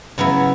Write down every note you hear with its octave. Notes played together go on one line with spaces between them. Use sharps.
C#3 F#3 B3 E4